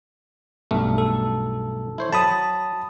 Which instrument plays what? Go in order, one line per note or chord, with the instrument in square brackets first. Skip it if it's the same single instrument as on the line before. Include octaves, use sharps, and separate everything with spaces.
[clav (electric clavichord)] B1 G2 A3
[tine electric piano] A4
[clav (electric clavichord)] E4 C5 C#5
[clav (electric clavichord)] F#3 [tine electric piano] A5 B5 D#6